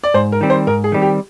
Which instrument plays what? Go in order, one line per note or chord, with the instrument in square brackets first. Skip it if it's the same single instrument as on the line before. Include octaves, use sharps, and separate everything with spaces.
[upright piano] D5
[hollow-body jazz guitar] G#2 [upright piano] C5
[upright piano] A#4
[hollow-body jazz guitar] D#3 G3 C4
[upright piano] C5
[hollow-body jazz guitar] G#2 [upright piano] A#4
[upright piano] G#4
[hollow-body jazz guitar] D#3 G3 C4
[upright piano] G4